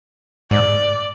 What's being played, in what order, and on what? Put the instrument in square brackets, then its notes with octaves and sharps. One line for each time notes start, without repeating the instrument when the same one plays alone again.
[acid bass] G#2 [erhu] D5